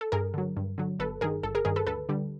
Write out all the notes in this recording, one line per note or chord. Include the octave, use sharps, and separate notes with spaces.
A4
G2 G#4 A#4
D3 F#3
G2
D3 F#3
G1 A4 B4
G2 D#3 G#4 A#4
G1 A4
G#4 A#4
G2 D#3 G#4 A#4
A4 B4
D2 A4 B4
D3 G3